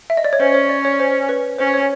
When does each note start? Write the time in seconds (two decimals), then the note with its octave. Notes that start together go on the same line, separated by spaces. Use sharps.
0.10 E5
0.17 D#5
0.24 D5
0.33 C#5
0.40 C#4 C5
0.54 C#5
0.69 D5
0.85 C#5
1.00 C5
1.29 B4
1.58 C#4 C5
1.74 C#5